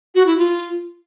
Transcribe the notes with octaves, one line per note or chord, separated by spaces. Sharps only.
F#4
E4
F4